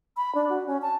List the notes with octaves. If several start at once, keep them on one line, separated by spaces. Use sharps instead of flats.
B5
D4
F#4
C#4
A5